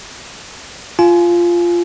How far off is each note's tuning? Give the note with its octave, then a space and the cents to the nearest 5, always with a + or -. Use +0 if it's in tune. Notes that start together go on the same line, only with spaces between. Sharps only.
F4 -10 G#5 +30